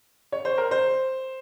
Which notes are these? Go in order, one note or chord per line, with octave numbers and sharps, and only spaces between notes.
C#5
C5
A#4
C5